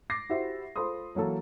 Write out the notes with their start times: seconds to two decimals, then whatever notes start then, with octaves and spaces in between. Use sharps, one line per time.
0.10 D6 A6 A#6 C7
0.30 E4 F#4 G4 C5 E5
0.76 F4 A4 C5 B5 C6 D#6
1.15 E3 F#3 A#3 A4